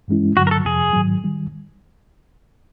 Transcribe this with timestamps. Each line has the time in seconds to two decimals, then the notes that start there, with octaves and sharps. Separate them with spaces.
0.08 G2 E3 G#3 C#4 E4
0.37 G2 D3 F#3 F#4
0.47 A#4
0.51 A4
0.65 F2 C3 F3 G#4
0.93 G#2 D#3 F#3
1.24 D#3 G3